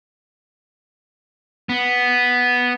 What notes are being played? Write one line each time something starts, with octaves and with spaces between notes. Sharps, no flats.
B3